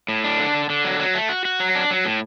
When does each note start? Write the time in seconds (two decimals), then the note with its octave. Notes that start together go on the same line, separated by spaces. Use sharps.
0.08 A2
0.24 D4
0.39 D3
0.55 D3
0.70 D3
0.85 F#3
0.99 F#3
1.14 A3
1.29 F#4
1.45 F#4
1.60 F#3
1.75 D4
1.91 F#3
2.05 A2